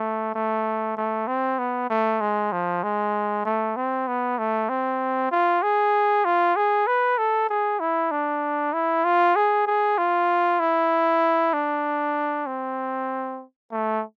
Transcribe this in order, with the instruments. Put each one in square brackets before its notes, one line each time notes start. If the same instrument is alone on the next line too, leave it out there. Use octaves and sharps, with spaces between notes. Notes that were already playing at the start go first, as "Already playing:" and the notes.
Already playing: [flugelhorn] A3
A3
A3
C4
B3
A3
G#3
F3
G#3
A3
C4
B3
A3
C4
F4
G#4
F4
G#4
B4
A4
G#4
E4
D4
E4
F4
G#4
G#4
F4
E4
D4
C4
A3